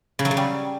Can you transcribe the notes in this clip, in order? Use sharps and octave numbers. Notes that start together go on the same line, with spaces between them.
C#3
F#3
C#3
G3